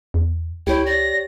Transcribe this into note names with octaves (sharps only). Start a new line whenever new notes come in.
E2
C#2 E4 G4 C#5 G5
D5 A#6